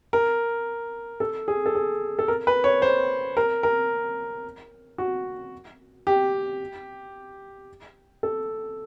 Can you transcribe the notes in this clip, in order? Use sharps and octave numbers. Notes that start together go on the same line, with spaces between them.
A#4
A4
G#4
A4
G#4
A4
A#4
B4
C#5
C5
A#4
A#4
F#4
G4
A4